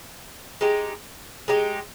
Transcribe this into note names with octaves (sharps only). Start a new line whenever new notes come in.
G#3 D#4 G4
G#3 D#4 G4